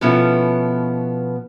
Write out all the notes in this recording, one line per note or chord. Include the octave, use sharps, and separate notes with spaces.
B2 F3 B3 C#4 E4 A4